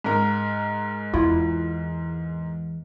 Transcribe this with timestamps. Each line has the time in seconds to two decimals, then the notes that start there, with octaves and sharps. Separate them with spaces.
0.04 G#2 A#4
1.14 E2 E4 F4